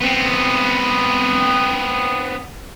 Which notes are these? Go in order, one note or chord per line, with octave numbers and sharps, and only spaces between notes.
B3 C4